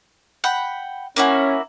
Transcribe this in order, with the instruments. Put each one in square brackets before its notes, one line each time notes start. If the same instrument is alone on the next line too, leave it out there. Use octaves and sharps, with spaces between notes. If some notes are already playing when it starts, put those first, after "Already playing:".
[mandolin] F#5 G5 B5
[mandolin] A#3 E4 F#4 [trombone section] C#4